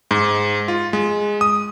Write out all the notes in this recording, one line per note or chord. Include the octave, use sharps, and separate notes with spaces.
G#2
F4
G#3
D#6